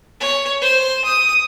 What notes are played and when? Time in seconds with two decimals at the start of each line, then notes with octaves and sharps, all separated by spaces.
0.20 C#5
0.62 C5
1.05 D#6